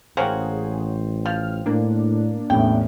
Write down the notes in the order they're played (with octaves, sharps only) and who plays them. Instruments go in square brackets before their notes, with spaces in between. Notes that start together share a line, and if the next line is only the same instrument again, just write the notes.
[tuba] A1 [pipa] A#3 C#4 F#4 [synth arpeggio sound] G#4 [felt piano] C5 G5
[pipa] F3 [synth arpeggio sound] F6
[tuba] A2 [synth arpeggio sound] A#3 D4
[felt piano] A1 E2 A2 [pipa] G5